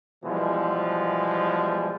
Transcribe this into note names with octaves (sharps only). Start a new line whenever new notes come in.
B2 E3 F3 G3 G#3